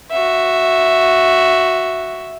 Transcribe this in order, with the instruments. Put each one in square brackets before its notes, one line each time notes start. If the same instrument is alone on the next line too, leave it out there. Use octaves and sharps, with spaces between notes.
[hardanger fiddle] F#4 E5